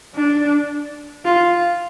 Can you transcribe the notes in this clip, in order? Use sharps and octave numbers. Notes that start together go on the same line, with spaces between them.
D4
F4